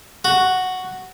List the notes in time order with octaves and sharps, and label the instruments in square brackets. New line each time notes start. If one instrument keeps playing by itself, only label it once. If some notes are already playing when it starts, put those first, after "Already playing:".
[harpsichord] F#4